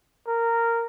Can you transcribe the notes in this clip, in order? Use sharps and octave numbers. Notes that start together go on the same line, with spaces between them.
A#4